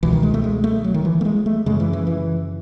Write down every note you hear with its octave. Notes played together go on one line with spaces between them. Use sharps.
C#2 B2 E3
D#3
G#3
A3
G#3
A3
F#3
D#3
E3
A3
G#3
A3
F#2 C#3 G#3
E3
E3
E3